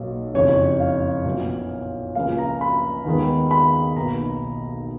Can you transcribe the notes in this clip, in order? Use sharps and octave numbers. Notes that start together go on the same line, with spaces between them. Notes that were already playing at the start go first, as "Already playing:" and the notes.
Already playing: B1 A#2 F#3 A#3
F#1 F2 C#3 C#5
F5
A#1 A#2 F#3 B3
C#2 C#3 F3 A#3 F5
A#5
B5
D#2 D#3 G#3 B3
B5
B1 B2 A#3 A#5